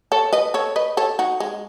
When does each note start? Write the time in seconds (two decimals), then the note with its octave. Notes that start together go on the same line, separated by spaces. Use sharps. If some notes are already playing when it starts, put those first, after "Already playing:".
0.12 A4 C#5
0.33 B4 D#5
0.54 A4 C#5
0.76 B4 D#5
0.97 A4 C#5
1.19 D#4 F#4
1.40 G#3